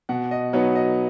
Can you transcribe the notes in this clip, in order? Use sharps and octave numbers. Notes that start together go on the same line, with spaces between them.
B2 F#5
D#5
F#3 B3 D#4 C#5
D#5